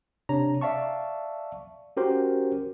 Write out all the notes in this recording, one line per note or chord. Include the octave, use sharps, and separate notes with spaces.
C3 D4 C#5 A#5
D5 E5 F5 A5 C#6
C#4 F#4 G4 A#4 C5